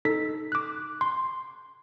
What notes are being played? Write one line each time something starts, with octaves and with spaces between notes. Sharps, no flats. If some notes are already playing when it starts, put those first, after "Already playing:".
D#4 A4 B6
D6 F#6
C6